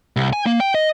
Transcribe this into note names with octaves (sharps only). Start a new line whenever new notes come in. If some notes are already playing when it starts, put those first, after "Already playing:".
C2
G#5
A#3
G5
D#5